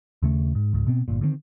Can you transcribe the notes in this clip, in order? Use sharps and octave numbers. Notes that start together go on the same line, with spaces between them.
D#2 C#3 A3
G#2
C#2 G#2
B2 B3 C4
G1 A#2
D3 D#3 G#3 C4